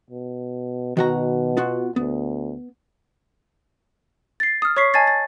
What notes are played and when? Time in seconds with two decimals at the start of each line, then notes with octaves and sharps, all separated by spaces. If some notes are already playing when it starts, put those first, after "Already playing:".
0.10 B2
0.97 B2 D#3 F#4 A#5
1.57 B3 F4 F#4
1.96 D2 B3
4.40 A6 C7
4.62 D#6 F6
4.77 C#5 C#6 B6 C7
4.94 D#5 G#5 A5 G#6 A6 C7
5.07 A6